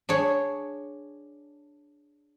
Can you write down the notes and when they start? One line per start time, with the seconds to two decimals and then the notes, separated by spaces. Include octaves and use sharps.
0.09 D4 G#4 C#5